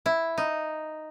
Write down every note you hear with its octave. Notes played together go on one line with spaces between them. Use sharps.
E4
D#4